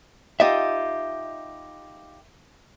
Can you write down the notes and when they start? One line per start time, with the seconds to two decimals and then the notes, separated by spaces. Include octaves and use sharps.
0.40 D#4 F4 G4 D#5 E5